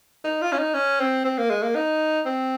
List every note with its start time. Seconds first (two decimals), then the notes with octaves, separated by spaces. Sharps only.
0.25 D#4
0.42 F4
0.52 C#4
0.59 D#4
0.74 C#4
1.00 C4
1.25 C4
1.38 A#3
1.50 G#3
1.63 A#3
1.75 D#4
2.26 C4